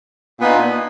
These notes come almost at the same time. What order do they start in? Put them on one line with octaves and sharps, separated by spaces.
A#2 B3 D#4 D4